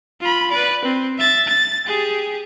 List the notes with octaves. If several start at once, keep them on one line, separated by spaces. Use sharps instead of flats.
F4 B5
B4 D5
C4
E5 A6
A6
G4 G#4